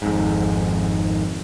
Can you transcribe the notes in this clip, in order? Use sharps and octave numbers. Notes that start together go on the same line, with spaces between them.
G#1 F2 G#2